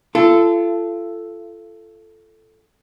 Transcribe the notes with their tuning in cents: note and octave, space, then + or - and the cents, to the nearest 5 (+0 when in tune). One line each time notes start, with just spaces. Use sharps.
F4 -35 A4 +0